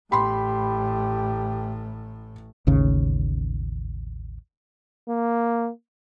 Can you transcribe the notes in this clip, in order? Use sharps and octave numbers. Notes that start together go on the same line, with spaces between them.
A1 A2 G4 B5 C6
A1 D#2 C#3
A#3